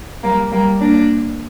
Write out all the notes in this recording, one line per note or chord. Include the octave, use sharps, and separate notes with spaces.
G3 A#3
G3 A#3
A#3 D4